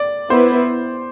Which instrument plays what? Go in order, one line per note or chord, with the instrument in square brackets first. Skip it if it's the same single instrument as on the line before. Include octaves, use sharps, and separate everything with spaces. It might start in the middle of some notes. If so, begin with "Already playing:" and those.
Already playing: [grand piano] D5
[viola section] B3 E4 B4 [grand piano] C5